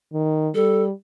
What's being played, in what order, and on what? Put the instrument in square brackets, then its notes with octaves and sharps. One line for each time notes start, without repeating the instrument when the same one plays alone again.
[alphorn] D#3
[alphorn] G3 [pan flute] A4